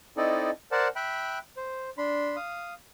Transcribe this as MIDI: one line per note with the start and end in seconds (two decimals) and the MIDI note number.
0.17 0.51 60
0.17 0.51 63
0.17 0.51 64
0.17 0.51 69
0.17 0.51 74
0.17 0.51 75
0.72 0.88 70
0.72 0.88 72
0.72 0.88 74
0.72 0.88 78
0.72 0.88 81
0.96 1.39 76
0.96 1.39 79
0.96 1.39 83
0.96 1.39 90
1.57 1.90 72
1.98 2.36 62
1.98 2.36 83
1.98 2.36 84
2.36 2.74 77
2.36 2.74 87